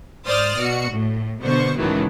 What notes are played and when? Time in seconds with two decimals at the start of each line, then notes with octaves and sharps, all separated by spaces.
0.25 G#2 C5 D5 D#6 F6 A6
0.59 B2 F#4 C#7
0.93 A2
1.42 B2 D3 B3 C5 C#6
1.78 C#2 A2 D#3 E3 F#3 A3